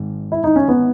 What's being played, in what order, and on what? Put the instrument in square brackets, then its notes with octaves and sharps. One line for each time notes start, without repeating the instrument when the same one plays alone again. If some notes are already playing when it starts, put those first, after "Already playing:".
Already playing: [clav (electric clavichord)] G#1 G#2
[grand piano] E4
D#4
C#4
B3